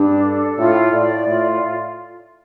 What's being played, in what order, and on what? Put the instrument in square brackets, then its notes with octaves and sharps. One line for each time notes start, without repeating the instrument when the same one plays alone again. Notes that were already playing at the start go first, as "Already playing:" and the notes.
Already playing: [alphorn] G2 [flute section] D4
[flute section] A4
[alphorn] A2 [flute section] F4
[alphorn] A2 [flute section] D5
[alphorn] A2 [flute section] F4